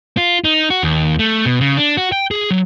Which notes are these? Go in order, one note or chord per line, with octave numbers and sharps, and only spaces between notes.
F4
D#4
F#4
D#2
A3
B2
C#3
D4
F#4
G5
G#4
F#3